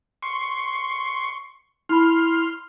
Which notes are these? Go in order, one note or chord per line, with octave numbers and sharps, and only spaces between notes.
C6 C#6
E4 B5 C6 F6